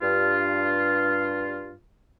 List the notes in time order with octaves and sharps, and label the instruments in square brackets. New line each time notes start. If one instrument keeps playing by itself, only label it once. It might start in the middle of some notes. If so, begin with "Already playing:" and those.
[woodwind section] G2 F4